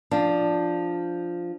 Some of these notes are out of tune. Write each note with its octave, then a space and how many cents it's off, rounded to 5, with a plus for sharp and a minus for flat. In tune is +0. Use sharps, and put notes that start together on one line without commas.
F3 +0 D4 +0